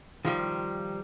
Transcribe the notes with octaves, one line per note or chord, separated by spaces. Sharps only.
D#3 F3 G3